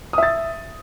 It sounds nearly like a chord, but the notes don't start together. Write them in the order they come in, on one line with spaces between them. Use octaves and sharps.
D#6 E5 A6